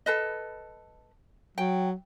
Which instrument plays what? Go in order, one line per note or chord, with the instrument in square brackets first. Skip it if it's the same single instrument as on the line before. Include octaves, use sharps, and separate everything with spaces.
[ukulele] A4 B4 D#5
[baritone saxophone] F#3 [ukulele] G5